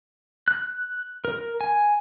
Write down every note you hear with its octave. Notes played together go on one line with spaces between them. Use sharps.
F#6
A#4
G#5